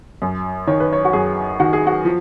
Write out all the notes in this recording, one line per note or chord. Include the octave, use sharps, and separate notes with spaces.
F#2
D#3 C#5
B4
C#5
F#4
F#2 G#4
D#3 F#4
G#4
F#4
F3